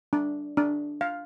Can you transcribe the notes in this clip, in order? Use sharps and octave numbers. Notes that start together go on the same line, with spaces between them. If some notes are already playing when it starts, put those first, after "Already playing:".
D4
D4
F5